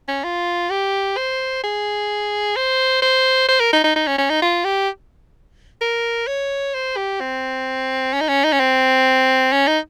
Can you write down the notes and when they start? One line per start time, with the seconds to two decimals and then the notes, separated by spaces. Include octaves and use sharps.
0.08 C#4
0.24 F4
0.70 G4
1.17 C5
1.64 G#4
2.56 C5
3.02 C5
3.49 C5
3.60 A#4
3.73 D#4
3.84 D#4
3.96 D#4
4.07 C#4
4.18 C#4
4.30 D#4
4.42 F4
4.64 G4
5.81 A#4
6.27 C#5
6.74 C5
6.97 G4
7.21 C4
8.13 C#4
8.21 D#4
8.29 C#4
8.44 D#4
8.53 C#4
8.60 C4
9.52 C#4
9.68 D#4